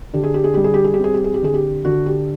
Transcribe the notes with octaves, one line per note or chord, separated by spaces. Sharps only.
D3 G4
G#4
G4
G#4
G3 G4
G#4
G4
G#4
G4
C4 G#4
G4
G#4
G4
D3 G#4
G4
D3 F#4
G4